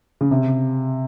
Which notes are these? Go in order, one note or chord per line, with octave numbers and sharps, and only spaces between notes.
C#3
C3